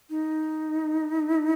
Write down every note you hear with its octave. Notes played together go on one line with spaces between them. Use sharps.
D#4